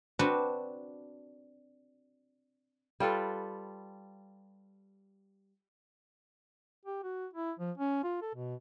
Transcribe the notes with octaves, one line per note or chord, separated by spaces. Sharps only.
C4 D4 F#4 B4
G3 F4 A4 B4
G4
F#4
E4
F3
C#4
F4
A4
B2